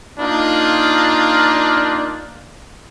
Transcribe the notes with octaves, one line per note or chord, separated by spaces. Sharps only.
A#3 D4 D#4 F4